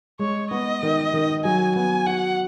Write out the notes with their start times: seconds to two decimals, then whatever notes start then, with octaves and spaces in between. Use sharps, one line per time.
0.19 G#3 C#5
0.50 B3 D#5
0.83 D#3
1.13 D#3
1.44 F#3 G#5
1.76 B3 G#5
2.06 F#4 F#5